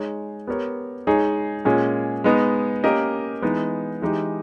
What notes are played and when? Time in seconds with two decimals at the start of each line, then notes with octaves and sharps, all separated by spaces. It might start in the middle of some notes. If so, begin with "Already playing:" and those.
Already playing: G#3 D#4 G#4 C#5
0.47 B3 G4 A#4 C#5
1.07 G#3 D#4 G#4 C#5
1.65 A#2 G#3 C#4 G#4
2.24 G#3 B3 D#4
2.83 A#3 C#4 G4 A#4 D#5
3.42 E3 G#3 B3 D#4
4.02 E3 G#3 D#4 G4